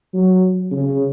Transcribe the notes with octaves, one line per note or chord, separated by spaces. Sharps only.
F#3
C#3